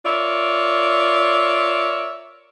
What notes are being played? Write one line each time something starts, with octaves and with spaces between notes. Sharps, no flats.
F4 A#4 C#5 D5 E5